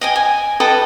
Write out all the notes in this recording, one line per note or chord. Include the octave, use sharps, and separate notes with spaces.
D#5 G5 G#5
G#5
A4 B4 D#5 G5